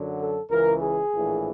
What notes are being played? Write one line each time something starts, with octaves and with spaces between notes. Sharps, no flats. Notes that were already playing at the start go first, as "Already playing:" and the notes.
Already playing: F#2 D3 F#3
A4
C#2 C#3 E3 A#4
G#4
A#1 A2 E3